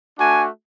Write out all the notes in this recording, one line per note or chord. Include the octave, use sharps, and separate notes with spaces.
A3 D4 F#4 G#5